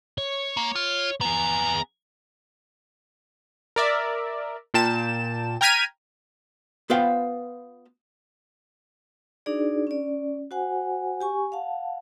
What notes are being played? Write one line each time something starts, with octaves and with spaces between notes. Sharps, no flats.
C#5
A#3
F4
B3 G#4 A#5
A#4 D5 E5
A#2 G5 A5 E7
G5 A#5 F6 G#6 B6 D#7
B3 F4 B4 C5 F5 G5
D4 D#4 F#4 G#4 D5
C#4 D5
F#4 C5 F#5 G#5
G4 G#5 C#6
F5 F#5 A5